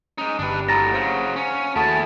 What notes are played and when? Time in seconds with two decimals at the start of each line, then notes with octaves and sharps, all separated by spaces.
0.18 G#3 C#4 D#4
0.39 G1 D4 G4 B4
0.69 D2 A2 A#5 A6 A#6
0.94 C#3 F#3 C5 F5 F#5
1.36 C#4
1.76 D#2 A3 E4 F#4 G#4 A5